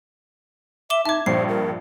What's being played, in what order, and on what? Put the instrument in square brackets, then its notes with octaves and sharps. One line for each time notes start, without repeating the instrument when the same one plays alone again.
[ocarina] E5 [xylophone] D6 E7 G7
[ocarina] D#4 [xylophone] E5 D6 [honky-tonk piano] A5 G#6
[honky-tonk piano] A#1 G2 [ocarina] C5 [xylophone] C7
[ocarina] A#4